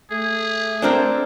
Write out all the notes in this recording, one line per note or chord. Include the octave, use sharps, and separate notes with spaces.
A3 G#4
C4 D4 A4 A#4 C5 G5